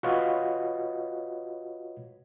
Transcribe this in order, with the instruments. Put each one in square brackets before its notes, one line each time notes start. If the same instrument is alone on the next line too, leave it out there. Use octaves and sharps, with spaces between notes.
[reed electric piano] F4 F#4 B4 C#5 D#5